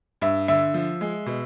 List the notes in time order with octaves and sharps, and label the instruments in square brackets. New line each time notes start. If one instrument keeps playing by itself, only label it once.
[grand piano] G2 E5
D3 E5
F3
G#3
B2